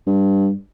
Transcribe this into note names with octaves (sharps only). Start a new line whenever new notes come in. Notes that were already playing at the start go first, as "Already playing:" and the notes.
G2